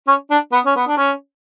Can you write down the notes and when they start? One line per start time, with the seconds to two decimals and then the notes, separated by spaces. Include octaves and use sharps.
0.07 C#4
0.31 D4
0.52 B3
0.66 C#4
0.76 B3
0.87 D4
0.97 C#4